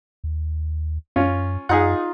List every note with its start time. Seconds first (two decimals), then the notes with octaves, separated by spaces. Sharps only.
0.24 D#2
1.16 F#2 C#4 F4
1.69 F#2 D#4 F4 G#4 F#5